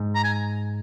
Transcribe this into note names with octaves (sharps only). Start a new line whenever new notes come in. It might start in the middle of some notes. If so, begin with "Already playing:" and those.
Already playing: G#2
A#5
G#5